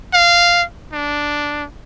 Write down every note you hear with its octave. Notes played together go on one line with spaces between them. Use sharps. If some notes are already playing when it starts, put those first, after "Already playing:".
F5
D4